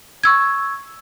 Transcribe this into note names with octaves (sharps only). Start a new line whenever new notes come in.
C#6 E6 G#6